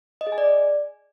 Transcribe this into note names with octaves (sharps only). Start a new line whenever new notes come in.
D#5
G#4
G#5
D5